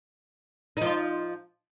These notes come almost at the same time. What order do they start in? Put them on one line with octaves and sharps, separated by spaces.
D#4 F3 F4